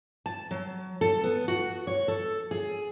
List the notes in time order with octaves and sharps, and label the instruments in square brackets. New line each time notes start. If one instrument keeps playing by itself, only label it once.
[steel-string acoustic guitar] A5
F#3
A4
B3
F#4
C#5
A4
G#4